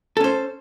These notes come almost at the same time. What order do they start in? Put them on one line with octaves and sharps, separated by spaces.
A4 C#4 C5